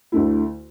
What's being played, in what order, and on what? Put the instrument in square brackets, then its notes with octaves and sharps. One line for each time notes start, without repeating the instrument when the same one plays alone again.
[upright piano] D2 D3 A3 E4